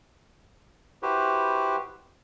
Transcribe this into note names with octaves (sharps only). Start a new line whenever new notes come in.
E4 F#4 G4 B4 C5